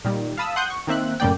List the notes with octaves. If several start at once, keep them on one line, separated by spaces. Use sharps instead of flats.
A#2 D#3 G3
F5 A5 B5 D#6 E6
F#5 C6 D#6 F#6 G6
C#6
D#3 A#3 C4 E5 F#6
F#2 A2 C#3 A#3 D5 G5